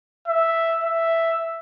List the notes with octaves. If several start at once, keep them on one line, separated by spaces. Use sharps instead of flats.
E5
E5